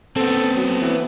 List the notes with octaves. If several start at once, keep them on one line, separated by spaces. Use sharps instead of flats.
B3 C4 A4
F#3
E3